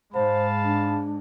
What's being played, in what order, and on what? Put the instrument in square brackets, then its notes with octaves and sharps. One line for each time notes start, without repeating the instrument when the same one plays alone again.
[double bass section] G#2 G#3 [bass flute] C5 [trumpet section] F5 A5 B5
[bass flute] D4